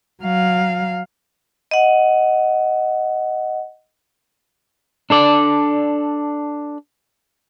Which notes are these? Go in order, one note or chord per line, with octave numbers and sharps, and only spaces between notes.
F#3 F5
D#5 F#5
D4 A4 D5